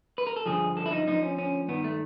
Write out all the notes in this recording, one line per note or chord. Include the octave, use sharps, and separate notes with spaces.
B4
A#4
A4
G2 D3 F3 G#4
A4
E4
D#4
D2 D3 F3 D#4
C#4
C#4
G2 D#3 B3
A3